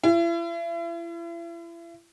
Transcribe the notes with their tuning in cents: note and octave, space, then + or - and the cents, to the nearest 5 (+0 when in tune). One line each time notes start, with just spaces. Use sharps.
E4 +40